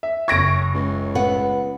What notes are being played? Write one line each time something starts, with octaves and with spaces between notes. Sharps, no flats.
E5
F#1 C#6 G#6 A#6 D7
C#2
B3 F#5